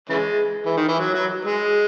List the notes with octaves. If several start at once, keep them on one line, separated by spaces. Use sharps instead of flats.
C#3 E3 G#3
E3
D#3
E3
F#3
F#3
G#3